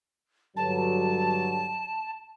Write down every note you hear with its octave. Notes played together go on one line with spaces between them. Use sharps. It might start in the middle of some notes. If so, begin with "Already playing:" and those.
G2 D3 F#3 A5